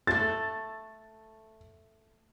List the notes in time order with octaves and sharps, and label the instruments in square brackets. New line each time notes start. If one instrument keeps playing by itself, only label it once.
[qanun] A3 E5 [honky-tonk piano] A6